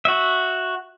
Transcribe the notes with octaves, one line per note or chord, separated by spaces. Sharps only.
F#4 E5